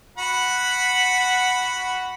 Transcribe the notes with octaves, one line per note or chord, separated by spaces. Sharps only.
F#4 F#5 B5